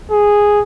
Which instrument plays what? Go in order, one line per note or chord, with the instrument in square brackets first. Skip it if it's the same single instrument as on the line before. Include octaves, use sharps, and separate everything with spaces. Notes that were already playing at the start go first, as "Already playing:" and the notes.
[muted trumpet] G#4